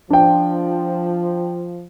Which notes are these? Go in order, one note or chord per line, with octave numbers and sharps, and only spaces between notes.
F3 D4 G5